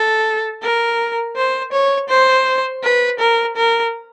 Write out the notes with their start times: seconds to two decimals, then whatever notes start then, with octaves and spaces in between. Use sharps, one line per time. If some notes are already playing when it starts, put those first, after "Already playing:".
Already playing: A4
0.63 A#4
1.37 C5
1.73 C#5
2.09 C5
2.84 B4
3.20 A#4
3.57 A#4